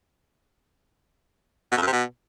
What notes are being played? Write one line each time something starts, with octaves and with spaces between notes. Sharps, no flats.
B2
F2
F#2
C3
B2